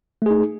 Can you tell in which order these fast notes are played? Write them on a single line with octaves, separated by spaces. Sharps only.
A3 G#4 D#4